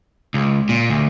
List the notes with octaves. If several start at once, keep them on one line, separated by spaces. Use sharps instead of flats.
C#2
A#2
D2